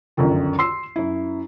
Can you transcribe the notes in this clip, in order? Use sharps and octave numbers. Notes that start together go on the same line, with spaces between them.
G1 C#2 F#2 D3 D#3 F3
C6 E6 C7
F#2 E4